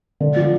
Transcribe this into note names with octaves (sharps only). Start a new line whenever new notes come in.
D3
F3